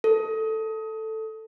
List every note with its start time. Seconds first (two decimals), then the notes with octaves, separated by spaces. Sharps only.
0.04 A4